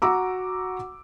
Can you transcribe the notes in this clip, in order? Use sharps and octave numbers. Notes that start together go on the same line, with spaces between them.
F#4 A#5 D6 E6